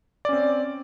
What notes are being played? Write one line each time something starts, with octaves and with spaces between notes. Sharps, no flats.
C4 C#4 D5